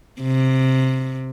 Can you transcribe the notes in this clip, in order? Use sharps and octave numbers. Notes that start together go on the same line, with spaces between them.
C3